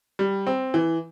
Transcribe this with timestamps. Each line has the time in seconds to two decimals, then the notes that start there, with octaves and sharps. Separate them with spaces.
0.19 G3
0.47 C4
0.74 E3